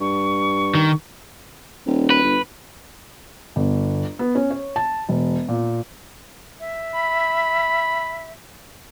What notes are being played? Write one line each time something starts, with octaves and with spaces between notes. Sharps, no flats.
G2 C#6
D#3
D#1
B4
G1
G1
B3
C#4
C#5
A5
E1
A#2
E5
B5